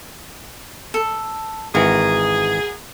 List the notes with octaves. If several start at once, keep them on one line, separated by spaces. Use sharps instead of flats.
A4
G#1 E3 F#4 G#4 A#4